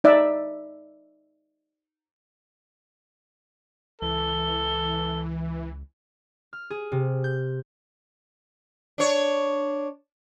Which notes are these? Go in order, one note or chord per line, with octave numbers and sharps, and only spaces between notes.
D#4 D5 E5
C#2 E3 A4 G7
F6
G#4
C3
G6
D4 C#5